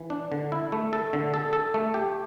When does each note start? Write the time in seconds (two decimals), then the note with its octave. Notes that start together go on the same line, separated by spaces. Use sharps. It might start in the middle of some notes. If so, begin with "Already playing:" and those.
Already playing: E3
0.10 D4
0.32 D3
0.52 E4
0.72 A3
0.93 A4
1.13 D3
1.34 A4
1.53 A4
1.74 A3
1.94 G4